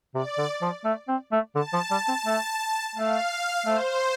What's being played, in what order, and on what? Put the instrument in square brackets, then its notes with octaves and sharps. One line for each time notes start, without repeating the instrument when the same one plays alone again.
[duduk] C3 [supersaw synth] D5
[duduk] D3
F3
A3
C4
A3
[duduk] D3 [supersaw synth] A5
[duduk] F3
G3
C4
A3
[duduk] A3 [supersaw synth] F5
[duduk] A3 [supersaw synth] C5